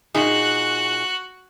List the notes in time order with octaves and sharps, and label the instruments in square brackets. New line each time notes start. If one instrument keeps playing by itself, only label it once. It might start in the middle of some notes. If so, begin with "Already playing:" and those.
[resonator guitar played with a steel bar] A#2 D#4 G#4 [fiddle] F#4 F#6